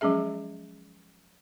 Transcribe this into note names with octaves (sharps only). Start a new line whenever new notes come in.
F3 F#3 G#3 C#4 G#4 E5